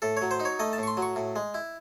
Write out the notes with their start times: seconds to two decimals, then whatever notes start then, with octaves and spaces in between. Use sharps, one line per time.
0.02 A2 A4
0.17 F#3 C#5
0.31 C5
0.40 D#4
0.45 C#5
0.59 A3 D#5
0.73 A5
0.78 A2 C#6
0.87 C6
0.97 F#3
1.02 C#6
1.16 A2
1.36 G#3
1.54 E4